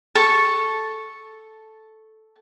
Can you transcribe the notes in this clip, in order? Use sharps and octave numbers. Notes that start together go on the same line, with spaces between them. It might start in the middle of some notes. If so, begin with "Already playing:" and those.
A4 C#6